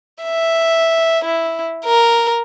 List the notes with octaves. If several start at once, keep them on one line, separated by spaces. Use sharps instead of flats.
E5
E4
A#4